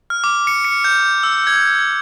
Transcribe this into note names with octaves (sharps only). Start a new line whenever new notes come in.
F6
D6
C#7
C#7
G6
E6
G#6